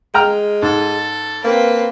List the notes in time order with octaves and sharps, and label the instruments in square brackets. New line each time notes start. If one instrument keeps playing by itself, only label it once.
[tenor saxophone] G#3 [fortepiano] G5 A#5 F6
[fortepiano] G#2 [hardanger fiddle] A4
[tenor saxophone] A#3 [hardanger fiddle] C4 B4